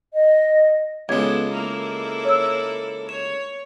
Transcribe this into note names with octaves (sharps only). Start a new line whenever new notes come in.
D#5
C#2 G#3 B3 E4 A4 G#6
A#3 E4 A4
C#5 E6
C#5 E7